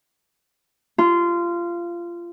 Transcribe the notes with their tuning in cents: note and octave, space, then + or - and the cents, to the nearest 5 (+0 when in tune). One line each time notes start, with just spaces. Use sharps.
F4 -20